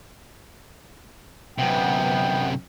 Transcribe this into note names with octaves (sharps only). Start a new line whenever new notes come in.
F#2 C3 B3 G5